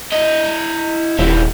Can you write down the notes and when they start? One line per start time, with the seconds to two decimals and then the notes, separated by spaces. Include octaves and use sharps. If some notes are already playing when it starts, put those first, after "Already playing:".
0.12 E4 D#5
1.19 D#1 E3 G3